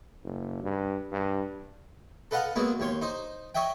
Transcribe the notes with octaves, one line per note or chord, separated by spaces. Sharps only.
F#1
G2
G2
A4 B4 D#5 F5 F#5 A#5
F#3 G#3 A#3 B3
D#2 C#5 C6
D#4 C5
C#5 D#5 E5 G5